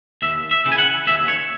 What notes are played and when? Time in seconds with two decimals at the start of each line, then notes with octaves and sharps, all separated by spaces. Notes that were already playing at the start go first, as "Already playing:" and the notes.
0.22 D#2 E5
0.51 E5
0.65 C#3 E3
0.72 G#5
0.78 F#5
1.07 D#2 E5
1.28 C#5